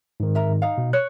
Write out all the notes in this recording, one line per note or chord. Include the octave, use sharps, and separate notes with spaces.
G#2 D#3
A#4 E5
D#4 F5
B2
C#5 F#6